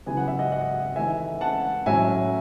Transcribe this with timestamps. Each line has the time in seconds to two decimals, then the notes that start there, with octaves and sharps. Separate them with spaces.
0.06 C#3 F#3 B3 E4 G#5
0.17 F#5
0.28 E5
0.39 D#5 F#5
0.52 D#5 F#5
0.96 E3 A3 D#4 E5 G#5
1.41 F#5 A5
1.86 A2 F#3 C#4 E5 G#5